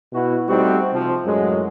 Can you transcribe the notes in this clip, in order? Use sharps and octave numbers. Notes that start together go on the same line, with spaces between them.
B2 E4 F#4
G3 A3 C4 D#4 F#4 G4
C3 F3
F#2 A2 F#3 G#3